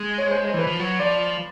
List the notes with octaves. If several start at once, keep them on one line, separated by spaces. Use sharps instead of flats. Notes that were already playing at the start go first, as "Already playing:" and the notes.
Already playing: G#3
C#5
C5
C5
E3
B4
F3
F#3
F3 D5